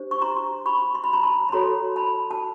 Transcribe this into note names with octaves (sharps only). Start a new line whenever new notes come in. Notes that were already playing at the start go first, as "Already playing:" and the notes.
Already playing: D4 G4 C5
C#6
A#5 C6
B5 C#6
C6
B5
A#5 C6
A5 B5
B5
F#4 A4 C#5 A#5 C6
A5 B5
A5